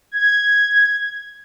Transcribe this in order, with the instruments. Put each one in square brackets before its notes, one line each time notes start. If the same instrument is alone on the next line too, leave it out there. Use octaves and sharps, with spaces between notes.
[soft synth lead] G#6